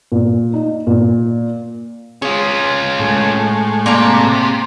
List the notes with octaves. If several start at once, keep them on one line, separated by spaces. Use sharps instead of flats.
A#2
D#4
A#2
C#4 F4 G#4
A2 G#3
C3 A#3 D5 A#5